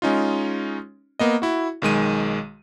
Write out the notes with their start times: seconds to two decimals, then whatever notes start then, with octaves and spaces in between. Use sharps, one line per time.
0.02 G#3 C#4 D#4 F4
1.19 A#3 B3 D#5
1.42 E4 F#4
1.82 B1 D#3 G#3 D#7